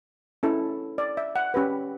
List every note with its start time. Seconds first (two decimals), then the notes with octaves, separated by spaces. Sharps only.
0.43 C#4 E4 A4
0.98 D5
1.17 E5
1.36 F#5
1.54 C#4 G4 B4